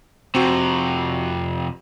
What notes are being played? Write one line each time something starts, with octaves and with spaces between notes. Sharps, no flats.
F2 C3 C4 F#4